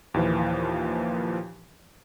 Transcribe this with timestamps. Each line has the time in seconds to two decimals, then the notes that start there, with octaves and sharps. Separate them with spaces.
0.14 D#2 A#2 E3 F3